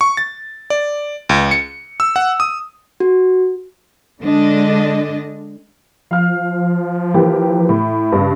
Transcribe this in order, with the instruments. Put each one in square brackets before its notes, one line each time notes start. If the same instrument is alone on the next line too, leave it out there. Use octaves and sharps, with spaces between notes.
[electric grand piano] C#6
A6
D5
C#2
C#7
E6
F#5
D#6
[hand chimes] F#4
[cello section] D3 G#3 D4 D#5
[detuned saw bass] F3 [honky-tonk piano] F5 F6
[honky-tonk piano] E3 A#3 G4
A2
G2 C#3